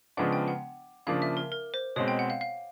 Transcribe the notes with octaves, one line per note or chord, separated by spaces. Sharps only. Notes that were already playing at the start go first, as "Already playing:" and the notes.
C#3 F3 G#3 B3 D4 F#5
G5
F#5
C#3 F3 A#3 D4 F5
E5
A#4
A#4
C5
B2 G#3 C4 C#5
G5
F#5
F5
F5